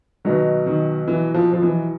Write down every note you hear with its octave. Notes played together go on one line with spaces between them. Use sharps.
B1 B2 D#3 F#3
D#3
E3
F3
F3
E3